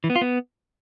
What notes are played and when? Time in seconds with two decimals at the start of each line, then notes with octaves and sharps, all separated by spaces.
0.04 E3
0.10 B3
0.16 F4
0.21 B3